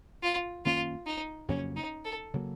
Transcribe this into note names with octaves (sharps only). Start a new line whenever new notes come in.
F4
F#2 D#3 A#3 C#4 F4
D#4
F2 C#3 F#3 A#3 C#4
D#4
A4
C#3 F#3 A#3